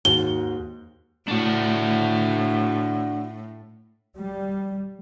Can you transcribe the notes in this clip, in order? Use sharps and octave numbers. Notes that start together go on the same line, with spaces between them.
D#2 G#2 F#4 G7
A2 D4 F#4
G3